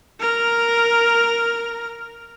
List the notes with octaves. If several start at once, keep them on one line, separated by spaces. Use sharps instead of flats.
A#4 F6